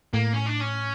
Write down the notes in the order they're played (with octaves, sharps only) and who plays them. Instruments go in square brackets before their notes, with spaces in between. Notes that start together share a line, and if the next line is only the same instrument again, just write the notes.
[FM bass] A2 [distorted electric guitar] A#3
[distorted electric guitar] C#4
D4
C#4